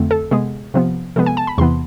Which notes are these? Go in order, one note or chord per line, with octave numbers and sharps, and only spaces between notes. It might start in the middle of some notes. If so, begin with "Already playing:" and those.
Already playing: F2 D3 A3 C4
A4
C3 G#3 B3 G#4
C3 F3 B3
C3 F3 G#3 B3 A4
G#5
A5
B5
E2 C3 E3 B3 C6